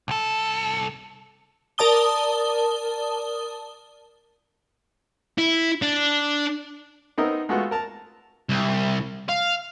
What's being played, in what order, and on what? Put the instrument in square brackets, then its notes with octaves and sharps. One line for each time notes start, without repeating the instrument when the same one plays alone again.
[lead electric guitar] C2 A4
[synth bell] A#4 D5 A5 D#6 G7
[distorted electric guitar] E4
D4
[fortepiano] B3 C4 D#4 A#4 D#5 E5
G#3 A3 B3 F4 F#4
A#4 A5 A#5
[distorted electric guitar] C2
F5